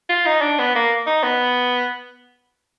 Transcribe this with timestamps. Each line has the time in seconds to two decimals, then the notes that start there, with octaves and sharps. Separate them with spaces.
0.09 F4
0.26 D#4
0.41 D4
0.59 B3
0.75 A#3
1.06 D#4
1.23 B3